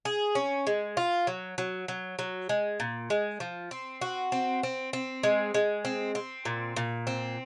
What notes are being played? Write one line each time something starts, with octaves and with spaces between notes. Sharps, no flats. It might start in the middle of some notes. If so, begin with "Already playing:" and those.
G#4
C#4
G#3
F4
F#3
F#3
F#3
F#3
G#3
A#2
G#3
F3
C4
F#4
C4
C4
C4
G#3
G#3
C4
C4
A#2
A#2
C4